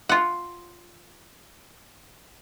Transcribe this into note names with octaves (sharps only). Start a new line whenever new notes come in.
F4 F#5